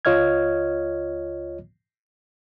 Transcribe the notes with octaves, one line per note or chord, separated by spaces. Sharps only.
C#2 F4 C#5 D#5 F6 G#6